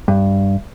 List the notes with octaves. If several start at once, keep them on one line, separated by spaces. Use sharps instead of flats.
G2